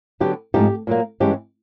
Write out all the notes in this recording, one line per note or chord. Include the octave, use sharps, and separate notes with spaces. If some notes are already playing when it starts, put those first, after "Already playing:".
D3 F#3 B3 G4
G#2 F3 A3 C4 D#4 G4
A#2 F#3 A#3
G2 E3 G#3 C#4 G4